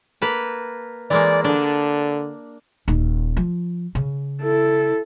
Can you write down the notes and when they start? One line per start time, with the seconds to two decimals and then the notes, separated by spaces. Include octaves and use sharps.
0.22 A#3 B4 A5
1.10 E3 G#3 A#3 D5
1.44 D3 D4
2.88 D#1 D#4
3.37 F3
3.95 C#3
4.42 E4 A4